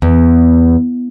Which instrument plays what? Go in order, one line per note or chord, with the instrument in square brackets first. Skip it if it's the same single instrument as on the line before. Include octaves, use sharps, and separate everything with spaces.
[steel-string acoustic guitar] E2